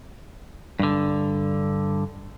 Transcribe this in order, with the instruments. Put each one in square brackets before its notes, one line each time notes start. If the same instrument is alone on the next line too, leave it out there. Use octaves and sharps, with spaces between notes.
[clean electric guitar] G2 D3